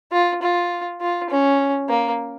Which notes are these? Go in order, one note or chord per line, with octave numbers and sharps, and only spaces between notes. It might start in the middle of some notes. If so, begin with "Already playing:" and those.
F4
F4
F4
C#4
A#3